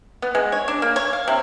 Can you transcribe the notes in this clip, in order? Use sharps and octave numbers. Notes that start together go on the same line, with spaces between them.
B3
G#3
C#5
D4
A#3
C#5
F5
C3